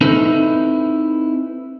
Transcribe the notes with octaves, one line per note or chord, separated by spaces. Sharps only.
C4 D#4 E4 A4 B4 E5